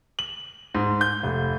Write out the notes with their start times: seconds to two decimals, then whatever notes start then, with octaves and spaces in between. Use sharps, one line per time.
0.19 F#7
0.74 G#2
1.01 G6
1.23 F1